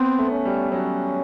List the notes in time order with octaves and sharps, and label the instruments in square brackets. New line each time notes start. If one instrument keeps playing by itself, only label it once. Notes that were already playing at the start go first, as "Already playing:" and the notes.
Already playing: [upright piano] B3 [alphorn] C4
[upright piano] A3
[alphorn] C#4
[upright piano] G3
[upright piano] F#3 [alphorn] C#4